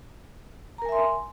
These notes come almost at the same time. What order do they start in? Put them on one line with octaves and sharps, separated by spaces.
A#5 A#4 G#5 E5 C6